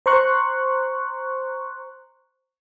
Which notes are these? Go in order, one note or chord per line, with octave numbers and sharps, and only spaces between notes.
C5 A#5 C6 C#6 F#6